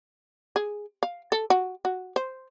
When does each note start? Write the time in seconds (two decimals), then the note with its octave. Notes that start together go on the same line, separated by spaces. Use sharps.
0.56 G#4
1.03 F5
1.32 A4
1.50 F#4
1.85 F#4
2.16 C5